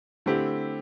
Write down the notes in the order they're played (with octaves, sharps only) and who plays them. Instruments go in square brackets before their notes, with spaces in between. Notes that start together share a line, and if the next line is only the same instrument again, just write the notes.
[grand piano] D3 A3 C4 E4 G4